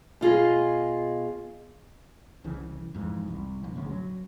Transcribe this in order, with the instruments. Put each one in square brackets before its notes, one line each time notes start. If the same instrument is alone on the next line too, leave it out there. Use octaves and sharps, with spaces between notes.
[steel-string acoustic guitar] B2 F4 G#4 D#5
[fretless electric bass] C2 C#3 E3
F2 G#2 E3
C2
F1 A#1
A1 D2 C#3
F#3